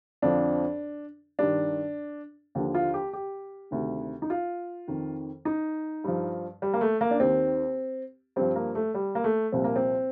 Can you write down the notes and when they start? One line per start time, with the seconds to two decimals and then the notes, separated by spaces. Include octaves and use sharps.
0.22 F2 D3 F3 D4
1.39 G2 D#3 D4
2.55 D#2 D3 F3
2.74 F4
2.94 G4
3.13 G4
3.71 D2 C3 D#3
4.22 D#4
4.30 F4
4.88 F2 D#3
5.45 D#4
6.04 G2 F3
6.62 G3
6.73 A#3
6.81 A3
7.01 A#3
7.11 D4
7.20 D#2 D#3 C4
8.36 G2 F3 C4
8.56 A#3
8.75 A3
8.94 G3
9.15 A#3
9.24 A3
9.52 C2 A#2 F3 C4
9.64 A#3
9.76 C4